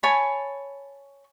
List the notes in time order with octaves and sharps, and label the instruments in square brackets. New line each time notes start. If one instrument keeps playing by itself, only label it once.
[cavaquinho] C#5 G#5 A5 B5